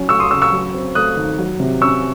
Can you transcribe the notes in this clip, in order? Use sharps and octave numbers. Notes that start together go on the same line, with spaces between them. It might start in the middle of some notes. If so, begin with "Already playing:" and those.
Already playing: F#3 C#4
A3 C#6 E6
C6 D#6
C#3 C#6 E6
C#6 E6
F#3
C4
A3 D#6 F#6
D#3
F#3
C3
C#4 C#6 E6